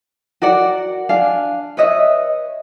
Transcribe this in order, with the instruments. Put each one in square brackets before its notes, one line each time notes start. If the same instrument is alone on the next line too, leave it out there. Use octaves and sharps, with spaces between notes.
[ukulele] F#4 A#4 D5 F#5
D4 D5 F5 G#5
B4 C#5 D#5 E5